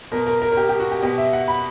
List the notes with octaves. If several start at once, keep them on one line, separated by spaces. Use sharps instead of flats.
B2 A#4
A#4
A#4
A#4
G4
G4
F#4
G4
B2 G4
E5
F#5
B5